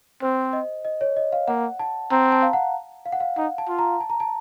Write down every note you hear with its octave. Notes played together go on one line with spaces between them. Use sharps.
C4 C5
D#5
D#5
C#5
D#5
F5
A#3 F#5
A5
C4 A#5
A5
F5
F#5
F5
F#5
F5
D#4 F#5
A5
F4
A#5
A5
A#5
A5